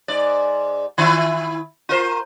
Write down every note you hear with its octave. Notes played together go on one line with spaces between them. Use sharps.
G#2 D5
D#3 E4 F4
F4 A#4 C5